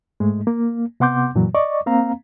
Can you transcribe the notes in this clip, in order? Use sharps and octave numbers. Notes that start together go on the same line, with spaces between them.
G#2 G#3 A3
A#3
C3 B3 F#5 C6 D6 G6
F#2 A#2 E3 F#3
D5 D#5 C#6 D6
A#3 C4 F5 A#5